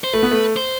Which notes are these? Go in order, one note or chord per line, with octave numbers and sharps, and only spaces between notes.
C5
A3 B4
B3
A3
C5